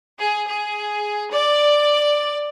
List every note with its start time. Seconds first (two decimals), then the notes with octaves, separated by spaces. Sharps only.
0.19 G#4
0.47 G#4
1.32 D5